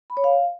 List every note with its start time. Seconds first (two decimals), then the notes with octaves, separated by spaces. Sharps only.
0.10 B5
0.17 C#5
0.24 F5